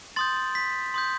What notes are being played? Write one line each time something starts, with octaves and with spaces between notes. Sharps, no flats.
C6 D#6 G6 A6
B6
C6 D#6 G6